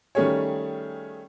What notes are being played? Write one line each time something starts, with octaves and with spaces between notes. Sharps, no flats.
D#3 G3 A3 C#4 G#4 C#5